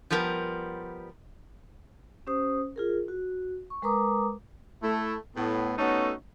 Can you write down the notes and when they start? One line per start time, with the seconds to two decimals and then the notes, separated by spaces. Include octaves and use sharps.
0.10 F3 G3 B3 A#4
2.27 C#4 G4 C5 D#6
2.76 F4 G#4 A#4
3.08 F#4
3.70 C#6
3.82 G#3 A#4 B4 A#5 D6 D#6
4.83 A3 E4
5.37 A2 B3
5.78 A3 B3 C#4 D#4 F#4 A4